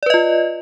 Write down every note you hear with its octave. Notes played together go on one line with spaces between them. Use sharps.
F4 B4 D5 D#5